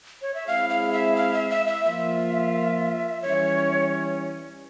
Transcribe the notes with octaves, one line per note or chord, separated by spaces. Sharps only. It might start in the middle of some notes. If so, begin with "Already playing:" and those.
C#5
E5
G#3 C4 E4 G#4 F5
F5
E5
F5
E5
E5
E5
F3 A#3 F4 E5
E3 G3 C#4 C#5